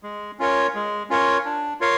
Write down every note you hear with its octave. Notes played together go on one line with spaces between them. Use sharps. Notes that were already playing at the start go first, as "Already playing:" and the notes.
G#3
C#4 F4 A#4 C#5
G#3
C#4 F4 A#4 C#5
D4
F4 A#4 C#5 F5